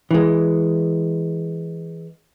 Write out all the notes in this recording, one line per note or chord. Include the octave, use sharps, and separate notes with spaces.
E3 G#3